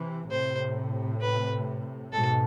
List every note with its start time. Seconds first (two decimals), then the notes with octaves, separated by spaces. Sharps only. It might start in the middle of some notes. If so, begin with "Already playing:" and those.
Already playing: C3 E3
0.30 A2 C3 C5
1.22 B4
2.12 G#2 B2 A4